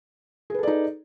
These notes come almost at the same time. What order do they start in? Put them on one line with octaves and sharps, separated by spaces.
G#4 B4 A4 D5 D#4